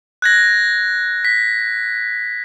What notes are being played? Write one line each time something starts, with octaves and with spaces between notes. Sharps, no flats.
F#6 G#6 A#6
B6